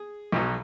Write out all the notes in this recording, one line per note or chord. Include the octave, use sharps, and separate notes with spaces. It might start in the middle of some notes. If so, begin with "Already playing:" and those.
Already playing: G#4
B1 B2 F#3